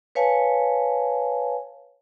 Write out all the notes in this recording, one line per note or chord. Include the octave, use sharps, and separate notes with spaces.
B4 C#5 F5 G#5 A5